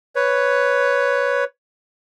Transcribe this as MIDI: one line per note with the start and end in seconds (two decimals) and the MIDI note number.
0.16 1.44 71
0.16 1.44 73